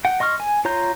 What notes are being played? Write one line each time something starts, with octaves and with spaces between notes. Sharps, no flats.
F#5 G5
D#5 C6 C#6 F6
G#5
F4 C#5 A#5 C6 G6